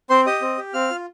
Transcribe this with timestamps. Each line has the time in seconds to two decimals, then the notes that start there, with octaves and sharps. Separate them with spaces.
0.10 C4 C5 C6
0.26 G4 D#5 D#6
0.41 C4
0.58 G4
0.74 C4 F5 F6
0.90 F4